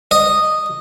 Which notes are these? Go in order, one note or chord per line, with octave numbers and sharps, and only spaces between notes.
D#5